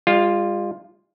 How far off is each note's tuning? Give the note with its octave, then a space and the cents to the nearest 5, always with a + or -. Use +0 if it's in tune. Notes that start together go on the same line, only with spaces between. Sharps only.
G3 +45 F4 +0